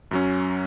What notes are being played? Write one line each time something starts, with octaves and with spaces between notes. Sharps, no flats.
F#2 F#3 C#4